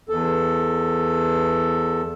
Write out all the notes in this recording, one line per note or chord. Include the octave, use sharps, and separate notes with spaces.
E2 A4